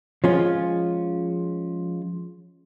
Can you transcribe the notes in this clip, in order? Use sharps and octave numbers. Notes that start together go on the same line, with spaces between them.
F3 G#3 C#4 F4